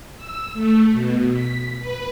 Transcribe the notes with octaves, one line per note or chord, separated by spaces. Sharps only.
E6
A3
B2
B6
B4